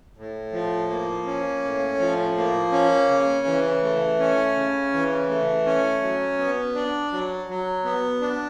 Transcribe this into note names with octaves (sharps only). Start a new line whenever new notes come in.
A2
F3
A#3
C#4
A2
F3
A#3
C#4
C#3
E3
A3
C#4
C#3
E3
A3
C#4
F#3
B3
D4
F#3
F#3
B3
D4